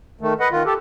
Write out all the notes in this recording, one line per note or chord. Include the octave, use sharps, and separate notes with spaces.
D#3 A3
B4 D#5 F#5
D#3 F4
G4 A4